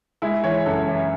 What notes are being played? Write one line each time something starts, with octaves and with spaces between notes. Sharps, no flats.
G#3 E4
E3 C#5
F#2 A4
E3